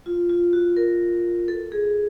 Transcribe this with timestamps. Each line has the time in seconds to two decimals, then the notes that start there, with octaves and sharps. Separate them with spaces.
0.06 F4
0.30 F4
0.53 F#4
0.77 A#4
1.48 A4
1.72 G#4